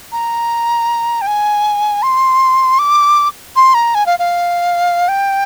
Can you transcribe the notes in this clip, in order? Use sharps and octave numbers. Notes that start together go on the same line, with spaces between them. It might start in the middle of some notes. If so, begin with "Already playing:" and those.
A#5
G5
G#5
C6
D6
C6
A#5
G#5
F5
F5
G5